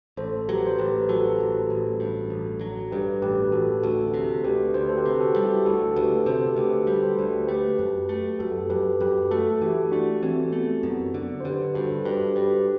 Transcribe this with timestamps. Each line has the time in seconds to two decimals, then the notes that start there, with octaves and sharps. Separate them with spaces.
0.17 A1 A4 C5
0.48 F#3 G4 B4
0.67 C5
0.78 A1 G4 B4
1.02 B4
1.09 F#3 F#4 A4
1.40 A1
1.70 A1
2.00 G2
2.30 A1
2.61 F#3
2.91 G2 G4 B4
3.22 A1 G4 B4
3.44 B4
3.52 A1 F#4 A4
3.83 D2 F#4 A4
4.14 C3
4.44 D2 G4 B4
4.74 D2 C5
4.82 B4
4.89 A4 C5
4.97 G4 B4
5.06 C3
5.20 F#4 A4
5.36 G3
5.43 E4 G4
5.65 D2 F#4 A4
5.96 D2 G4 B4
6.26 C3 A4 C5
6.57 D2 G4 B4
6.87 G3
7.02 A4 C5
7.19 D2
7.48 A3 G4 B4
7.79 F#2
8.09 A3
8.39 F#2 F#4 A4
8.70 F#2 G4 B4
9.00 F#2 G4 B4
9.31 A3 F#4 A4
9.61 E3 E4 G4
9.91 A3 D4 F#4
10.22 E3 C4
10.52 A3 B3
10.83 F#2 B3
11.14 D3
11.40 C5
11.44 D3 G4 B4
11.75 G2 F#4 A4
12.05 G2 G4 B4
12.35 G2 G4 B4